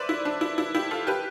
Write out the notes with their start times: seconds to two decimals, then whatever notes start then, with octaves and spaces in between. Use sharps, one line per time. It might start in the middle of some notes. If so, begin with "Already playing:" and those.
Already playing: B4 C5 D5 E5
0.09 E4
0.25 D4
0.41 E4
0.58 E4
0.75 E4 G4
0.91 F4 A4
1.07 G4 B4